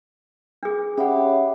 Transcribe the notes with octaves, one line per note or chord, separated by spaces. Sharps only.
D4 G#4
C#4 G4 C#5 E5 F#5 B5